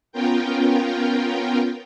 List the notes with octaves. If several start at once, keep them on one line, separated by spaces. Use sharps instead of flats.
B3 C#4 F4 A#4 G5